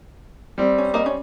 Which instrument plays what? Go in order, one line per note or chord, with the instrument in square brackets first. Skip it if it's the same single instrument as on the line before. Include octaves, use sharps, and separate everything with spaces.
[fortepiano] G3 C4
[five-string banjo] C#4
A#3 D#5
C#4